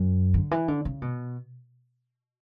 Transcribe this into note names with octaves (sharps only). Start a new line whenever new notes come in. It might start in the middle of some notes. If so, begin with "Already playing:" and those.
Already playing: F#2
D3
E3
D3
C#3
B2